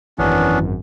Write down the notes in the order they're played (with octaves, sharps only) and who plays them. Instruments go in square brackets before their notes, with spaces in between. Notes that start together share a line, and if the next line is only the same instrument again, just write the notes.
[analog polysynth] G#1 F#2 [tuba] E3 [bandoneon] B3 C#4 D4